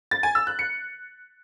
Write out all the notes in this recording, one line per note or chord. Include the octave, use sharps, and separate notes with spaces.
A6
G#5
E6
F#6
C#7